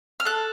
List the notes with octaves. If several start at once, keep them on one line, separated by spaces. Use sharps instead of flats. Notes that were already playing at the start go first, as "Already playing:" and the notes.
F6
A4 F#6